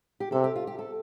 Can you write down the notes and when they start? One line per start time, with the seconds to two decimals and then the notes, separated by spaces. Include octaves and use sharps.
0.20 G4
0.32 C3 A4
0.44 G4
0.55 F4
0.67 G4
0.79 A4